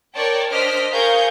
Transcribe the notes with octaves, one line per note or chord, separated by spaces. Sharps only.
A#4 C#5 D5 G5 A5
D4 C5 D#5 F6 B6 D7
G#4 A#4 F5 C#6 G6